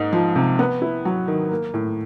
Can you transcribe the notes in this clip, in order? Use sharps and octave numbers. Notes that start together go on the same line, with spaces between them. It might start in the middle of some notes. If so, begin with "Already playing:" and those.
Already playing: G#2 A#3 D#4
F3
C3
B3
E4
F#3
D#3
A#3
A2